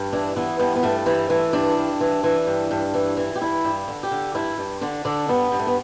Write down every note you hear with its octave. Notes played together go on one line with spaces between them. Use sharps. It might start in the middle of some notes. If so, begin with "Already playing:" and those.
Already playing: G2
E3 D4
E3 B3
G2 B3
B3
G2 A3
E3 G3
E3 A3
G2 D4
G2
E3
E3
G2
G2
E3
E3
G4
G2 E4
G2
D3
G4
D3
G2 E4
G2
D3 D4
D3 D4
G2 B3
G2
A3
B3